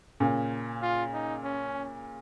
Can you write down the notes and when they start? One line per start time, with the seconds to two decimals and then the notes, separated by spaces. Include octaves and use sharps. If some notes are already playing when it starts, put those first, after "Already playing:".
0.20 A#2 C#3
0.82 F4
1.13 D#4
1.44 C#4